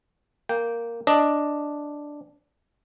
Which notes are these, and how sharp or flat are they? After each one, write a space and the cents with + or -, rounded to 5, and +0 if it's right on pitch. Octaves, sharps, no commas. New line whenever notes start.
A#3 +0 G5 +0
D4 +0 D#5 +0